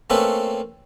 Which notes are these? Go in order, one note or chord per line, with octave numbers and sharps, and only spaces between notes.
A3 A#3 C4 C#4 A4 B4